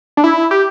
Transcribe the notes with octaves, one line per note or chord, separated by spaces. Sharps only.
D4
E4
G4